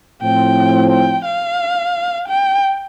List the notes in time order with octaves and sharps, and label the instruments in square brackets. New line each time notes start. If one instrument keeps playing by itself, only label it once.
[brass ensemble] A2 F3 C4 [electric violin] G5
[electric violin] G5
F5
G5